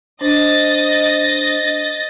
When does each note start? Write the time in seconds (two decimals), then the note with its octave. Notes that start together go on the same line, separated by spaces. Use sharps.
0.21 D4 C5 D#5 A6 A#6